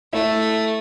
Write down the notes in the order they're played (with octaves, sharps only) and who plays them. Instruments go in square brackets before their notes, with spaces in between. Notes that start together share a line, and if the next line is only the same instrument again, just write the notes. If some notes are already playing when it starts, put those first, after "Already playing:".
[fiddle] A3 [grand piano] E4